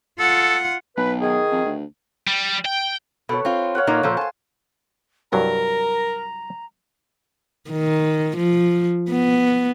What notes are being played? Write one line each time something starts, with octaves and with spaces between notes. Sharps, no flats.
F4 A4 F#5
B1 B4
D#3 G#4
F2
D2
G3
G5
B2 A4 B4 C#5
C4 F4
C#5 F5 F#5
A#2 A#3 D#4
A#2 F3 A4 C5
G#5 A5 C6
C2 G2 F#3 A#4 A#5
D#3
F3
B3